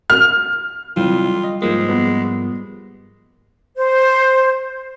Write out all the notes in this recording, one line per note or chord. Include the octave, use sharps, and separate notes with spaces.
F6
C3 E3 G3 F4
D#5
G#2 F3 G#3 A#3
B3
C5